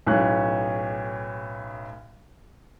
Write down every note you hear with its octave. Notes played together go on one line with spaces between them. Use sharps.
B1 A2 C#4 F#6